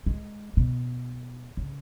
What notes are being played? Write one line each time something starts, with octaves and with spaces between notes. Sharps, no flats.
G#3
B2
C#3